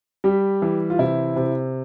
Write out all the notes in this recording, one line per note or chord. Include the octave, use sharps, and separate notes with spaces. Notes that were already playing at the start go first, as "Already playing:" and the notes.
G3 G4
E3
F4
C3 E4
C3